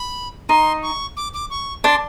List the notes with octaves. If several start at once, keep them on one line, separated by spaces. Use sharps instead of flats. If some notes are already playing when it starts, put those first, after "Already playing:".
Already playing: B5
D#4 C6
C#6
D6
D6
C#6
D4 C6